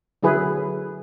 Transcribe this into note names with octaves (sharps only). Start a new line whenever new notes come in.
D3 F#3 E4 G#4 B4